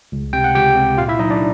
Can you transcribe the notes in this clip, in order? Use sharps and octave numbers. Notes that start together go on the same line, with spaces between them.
C#2
C3 G5
F#5
C#2 G4 G5
C3
A#2 F4 F5
E4 E5
F#3 D#4 D#5
D4 D5